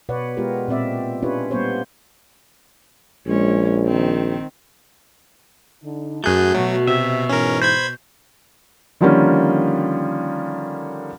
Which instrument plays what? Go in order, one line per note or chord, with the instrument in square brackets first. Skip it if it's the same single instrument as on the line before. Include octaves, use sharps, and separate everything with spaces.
[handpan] B2 B4 C#5 D5 F#5
G#3 B3 F4 G4 A#4
A#2 C4 D5 E5
C#4 D4 F4 G4 B4 C#5
G3 A#3 B3 C5 C#5
[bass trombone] A#1 [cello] G#3 C#4
[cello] D#3 C4
[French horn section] D3 D#4
[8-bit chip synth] F#2 G#4 G6 [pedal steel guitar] A3 F#6 [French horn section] F#4
[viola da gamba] B2 [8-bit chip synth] F#3
[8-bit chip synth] C3 [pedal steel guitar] E5
[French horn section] G#2 E3 [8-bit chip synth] C#4 A#4
[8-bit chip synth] C5 B5 G#6 [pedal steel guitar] G6
[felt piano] D3 D#3 F3 G3 A#3 C#4